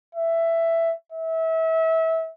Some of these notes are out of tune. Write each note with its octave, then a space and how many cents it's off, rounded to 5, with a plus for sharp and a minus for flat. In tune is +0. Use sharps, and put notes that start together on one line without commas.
E5 +10
E5 -25